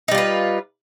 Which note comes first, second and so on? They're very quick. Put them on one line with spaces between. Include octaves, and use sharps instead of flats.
D#4 G3 F4 B4